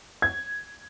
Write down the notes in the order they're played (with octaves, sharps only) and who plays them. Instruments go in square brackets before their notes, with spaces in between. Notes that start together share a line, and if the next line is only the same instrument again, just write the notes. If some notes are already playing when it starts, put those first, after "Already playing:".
[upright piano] G#6